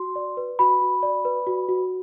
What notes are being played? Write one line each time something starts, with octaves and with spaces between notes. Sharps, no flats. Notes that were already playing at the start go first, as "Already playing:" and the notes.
Already playing: F#4 C6
D5
B4
F#4 B5
F#4
D5
B4
F#4
F#4